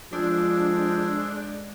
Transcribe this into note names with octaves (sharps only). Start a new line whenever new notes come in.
F3 G#3 D4 G#4 A4 C5